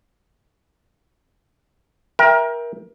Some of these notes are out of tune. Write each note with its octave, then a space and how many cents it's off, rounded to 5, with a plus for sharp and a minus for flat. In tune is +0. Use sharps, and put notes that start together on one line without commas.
A#4 +25 E5 +0 G5 +15